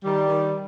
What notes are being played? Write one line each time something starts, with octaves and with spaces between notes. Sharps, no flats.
D#3 G3
D#3